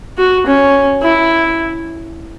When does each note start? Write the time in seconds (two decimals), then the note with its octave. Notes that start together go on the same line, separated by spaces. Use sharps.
0.18 F#4
0.46 C#4
1.02 E4